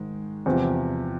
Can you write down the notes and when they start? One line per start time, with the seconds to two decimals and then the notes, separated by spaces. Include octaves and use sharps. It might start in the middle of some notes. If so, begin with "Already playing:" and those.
Already playing: G#2 D#3 G#3
0.46 E2 C3 F3